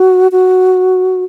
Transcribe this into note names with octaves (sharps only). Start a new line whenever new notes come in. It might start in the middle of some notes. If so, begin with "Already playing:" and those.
Already playing: F#4
F#4